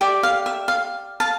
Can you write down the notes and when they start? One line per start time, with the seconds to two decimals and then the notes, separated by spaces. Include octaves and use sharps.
0.01 G4 D5 E5
0.23 F5
0.46 E5
0.68 F5
1.20 F5 A5